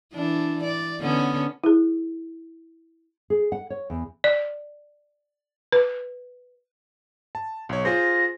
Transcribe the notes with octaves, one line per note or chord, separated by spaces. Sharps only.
E3 D4
D5
D3 B3 C#4
E4 G#4
G#4
F#5
C#5
E2
D5
B4
A5
B1 C#5
F4 G#4 C5 A#6